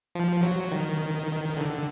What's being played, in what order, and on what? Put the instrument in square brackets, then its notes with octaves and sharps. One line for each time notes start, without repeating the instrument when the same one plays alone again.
[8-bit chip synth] F3
F#3
D#3
D3